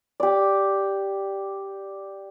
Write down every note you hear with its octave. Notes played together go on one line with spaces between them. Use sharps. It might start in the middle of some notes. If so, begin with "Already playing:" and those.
G4 D5